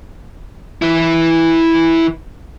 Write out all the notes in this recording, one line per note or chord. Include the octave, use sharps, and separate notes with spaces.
E3 E4